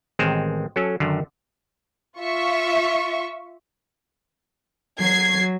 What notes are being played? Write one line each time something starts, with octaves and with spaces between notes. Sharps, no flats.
A1 D#3 G#3 C4
F#3 C#4 A4
F#2 D3 D#3
F4 E5 C#6
F#3 G#6 C7